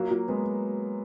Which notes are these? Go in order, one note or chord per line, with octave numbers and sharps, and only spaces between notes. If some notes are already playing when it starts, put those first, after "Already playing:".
Already playing: F#3 A#3
F#3 A#3
G#3 B3